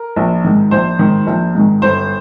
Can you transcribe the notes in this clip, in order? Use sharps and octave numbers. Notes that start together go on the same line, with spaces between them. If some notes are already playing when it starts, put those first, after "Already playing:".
Already playing: A#4
A#1
G#2 D#3
A#1 C5
G#2 D#3
A#1
G#2 D#3
G1 C5